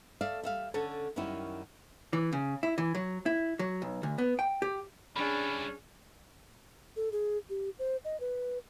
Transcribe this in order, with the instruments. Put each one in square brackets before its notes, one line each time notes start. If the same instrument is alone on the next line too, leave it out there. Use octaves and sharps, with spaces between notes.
[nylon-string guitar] A3 D5 E5 F5
G3 E5 F5
D3 C#4 A4
F#2 D#3 G3 C#4 E4
[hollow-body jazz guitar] E3
C#3
E4
E3
F#3
E4
F#3
B1
D2
B3
G5
G4
[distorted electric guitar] E3 G3 [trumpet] C#4 [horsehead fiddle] D4 G#4 [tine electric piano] B5
[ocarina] A4
G#4
G4
C5
D#5
B4